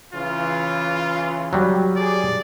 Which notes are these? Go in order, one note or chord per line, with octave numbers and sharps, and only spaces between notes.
C#3 E3 F4
F#3 G3
G#4 D5